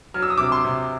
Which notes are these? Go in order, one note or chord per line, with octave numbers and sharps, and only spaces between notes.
F#3 F6
E6
D#6
C3 D6 E6
C6 D6
C3